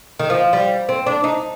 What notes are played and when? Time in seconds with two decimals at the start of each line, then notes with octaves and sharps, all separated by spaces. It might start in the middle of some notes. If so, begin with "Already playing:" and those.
0.19 D#3
0.30 F3
0.53 G3
0.89 C4
1.07 D4
1.24 D#4